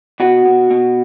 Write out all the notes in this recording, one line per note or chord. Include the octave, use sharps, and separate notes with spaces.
B2 F#4
B2
B2